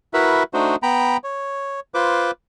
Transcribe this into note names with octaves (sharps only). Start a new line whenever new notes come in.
E4 F#4 A#4 B4 E5
A3 D4 D#4 F#4 C5
B3 G5 A#5 B5
C#5
F4 B4 C5 D6